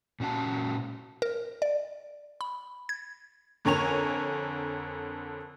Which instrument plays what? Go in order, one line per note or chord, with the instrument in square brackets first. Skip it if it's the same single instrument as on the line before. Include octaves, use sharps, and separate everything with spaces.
[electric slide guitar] A#2 C#4 F#4 A5
[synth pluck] A#4
D5
B5
G#6
[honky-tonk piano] F2 D3 A#4 C#5 G#5 F7